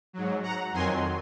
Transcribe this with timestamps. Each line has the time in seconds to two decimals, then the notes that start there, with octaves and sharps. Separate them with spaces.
0.13 G#2 F#3
0.43 F#5 A#5
0.73 F2 D#3 F#3 G#5 C6